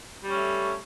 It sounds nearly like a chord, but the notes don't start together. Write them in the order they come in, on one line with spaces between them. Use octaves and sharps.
G3 C#4 A3